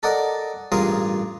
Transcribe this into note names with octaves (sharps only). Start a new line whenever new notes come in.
A4 A#4 D5 D#5 F#5
A1 G2 F4 G#4 A#4 D#6